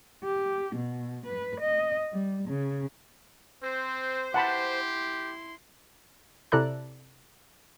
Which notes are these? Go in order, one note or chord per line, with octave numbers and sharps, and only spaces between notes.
G4
B2
B4
D#5
G3
C#3
C4 C5
E4 G4 F#5 A5 B5 C6
C3 E4 A4 D5 A#5 F#6